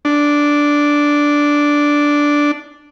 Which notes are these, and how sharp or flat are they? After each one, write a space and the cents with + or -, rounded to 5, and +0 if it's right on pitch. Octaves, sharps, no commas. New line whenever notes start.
D4 -5